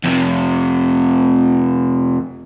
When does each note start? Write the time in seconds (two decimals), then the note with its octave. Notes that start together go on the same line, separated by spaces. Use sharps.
0.04 F2 C3